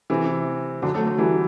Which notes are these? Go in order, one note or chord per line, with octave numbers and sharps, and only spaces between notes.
C3 E3
D3 F#3
F#3 A3
F#3 A3
E3 G3